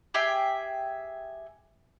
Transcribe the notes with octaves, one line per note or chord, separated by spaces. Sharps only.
G4 G#4 E5 G5